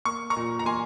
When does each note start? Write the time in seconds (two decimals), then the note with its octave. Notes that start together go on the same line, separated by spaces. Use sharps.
0.05 A#3 C#6
0.30 A#5 C#6
0.36 A#2
0.59 A#5
0.66 A#3 G#5 C6